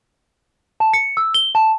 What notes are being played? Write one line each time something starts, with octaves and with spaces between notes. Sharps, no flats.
A5
C#7
E6
G7
A5